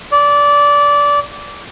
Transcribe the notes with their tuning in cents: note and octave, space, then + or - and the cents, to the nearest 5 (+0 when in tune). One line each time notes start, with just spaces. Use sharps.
D5 -20